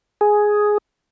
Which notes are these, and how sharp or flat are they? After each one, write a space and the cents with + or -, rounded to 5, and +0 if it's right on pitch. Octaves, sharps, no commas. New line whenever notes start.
G#4 +5